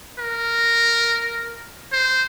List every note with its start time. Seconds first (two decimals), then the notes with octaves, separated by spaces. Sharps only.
0.19 A#4
1.92 C5